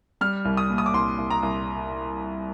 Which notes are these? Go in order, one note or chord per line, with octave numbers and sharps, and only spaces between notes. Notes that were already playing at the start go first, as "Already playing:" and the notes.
G3 F6
C2
D#6
A#2
D#6
D6
C2 C6
C2
A#5
C2